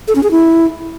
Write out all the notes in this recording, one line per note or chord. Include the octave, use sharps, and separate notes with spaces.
A4
C#4
G#4
E4